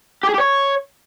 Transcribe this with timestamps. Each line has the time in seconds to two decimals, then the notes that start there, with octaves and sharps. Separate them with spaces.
0.23 G4
0.29 G#4
0.34 G4
0.40 C#5